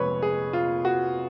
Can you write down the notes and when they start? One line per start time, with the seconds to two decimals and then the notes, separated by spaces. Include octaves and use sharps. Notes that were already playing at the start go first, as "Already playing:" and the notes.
Already playing: F1 F2 F3 G#3 B4 C#5
0.22 G#4
0.53 F4
0.85 F#4